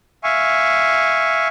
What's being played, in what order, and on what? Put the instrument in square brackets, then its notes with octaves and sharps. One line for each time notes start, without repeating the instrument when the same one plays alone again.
[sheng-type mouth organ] E5 F5 G#5 C#6